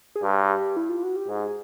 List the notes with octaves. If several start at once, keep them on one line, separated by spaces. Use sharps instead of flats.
G#4
G2 G4
E4
F4
F#4
G4
G#2 G#4